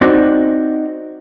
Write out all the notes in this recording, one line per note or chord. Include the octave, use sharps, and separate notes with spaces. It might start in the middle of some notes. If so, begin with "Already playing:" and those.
C4 D#4 F#4 D5